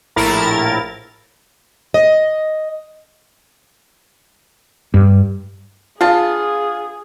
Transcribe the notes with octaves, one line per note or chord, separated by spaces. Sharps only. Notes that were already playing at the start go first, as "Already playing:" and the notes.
A#1 A2 E4 A#4 A6
D#5
G2
B3 D4 F4 G#4 A5